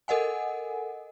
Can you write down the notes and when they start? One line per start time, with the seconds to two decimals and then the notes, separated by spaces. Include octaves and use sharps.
0.08 A4 A#4 D#5 F#5 G#5